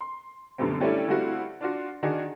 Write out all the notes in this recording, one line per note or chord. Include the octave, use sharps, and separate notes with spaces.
C6
F#2 B2 D3 G3 A3 C4
G3 A3 C#4 D4 E4 A4
G3 A3 C4 E4 F#4 F5
D4 F4 F#4
D#3 D4 D#4 F#4 G#4